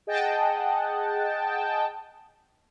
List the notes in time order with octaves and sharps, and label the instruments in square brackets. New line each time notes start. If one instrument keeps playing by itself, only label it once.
[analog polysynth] G#4 D#5 F#5 G5 A5